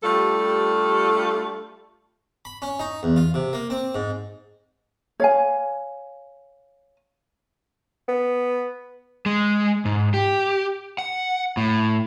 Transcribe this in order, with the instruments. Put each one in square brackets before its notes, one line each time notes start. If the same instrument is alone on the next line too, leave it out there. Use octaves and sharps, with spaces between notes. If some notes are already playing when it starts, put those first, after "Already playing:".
[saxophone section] G3 A3 D4 F4 G4 A4
[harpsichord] B5
C#4
D#4
E2
F4
C3
A#3
C4
G#2
[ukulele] C#5 F5 G#5
[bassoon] B3
[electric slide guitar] G#3
G#2
G4
F#5
A2